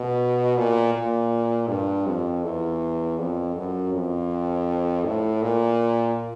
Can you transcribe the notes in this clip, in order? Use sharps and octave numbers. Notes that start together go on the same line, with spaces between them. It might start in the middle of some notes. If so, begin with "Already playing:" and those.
Already playing: B2
A#2
A#2
G2
F2
E2
F2
F#2
F2
A2
A#2